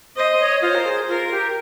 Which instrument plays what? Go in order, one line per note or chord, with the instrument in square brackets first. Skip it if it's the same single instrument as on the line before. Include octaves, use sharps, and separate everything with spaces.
[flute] C5 [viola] D#5
[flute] C#5
[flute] F4 [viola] C5
[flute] A#4
G#4
[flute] F4 [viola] A#4
[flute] G4